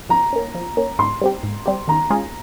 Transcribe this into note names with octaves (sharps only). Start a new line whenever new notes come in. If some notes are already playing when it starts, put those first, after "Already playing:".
F3 A#5
A#3 C#4
F3
A#3 C#4
G#2 C6
G3 C4 G4
G#2
G3 C4 G4
D#3 A#5
G#3 C#4 F4 G#4